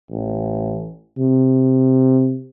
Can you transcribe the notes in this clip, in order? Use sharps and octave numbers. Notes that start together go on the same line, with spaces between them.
A1
C3